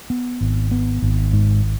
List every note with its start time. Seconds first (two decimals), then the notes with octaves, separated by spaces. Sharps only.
0.10 B3
0.41 G#1
0.71 B3
1.02 G#1
1.33 G#2